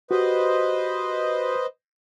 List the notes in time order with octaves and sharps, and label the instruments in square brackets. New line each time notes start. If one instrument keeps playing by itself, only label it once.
[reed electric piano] F#4 G4 [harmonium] B4 C5 D#5